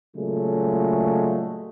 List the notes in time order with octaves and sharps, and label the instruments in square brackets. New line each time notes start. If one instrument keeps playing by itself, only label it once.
[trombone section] A#2 C#3 F#3 G#3 A3